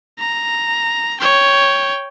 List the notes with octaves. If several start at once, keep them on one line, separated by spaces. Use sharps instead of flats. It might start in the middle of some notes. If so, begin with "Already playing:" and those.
A#5
C#5 G5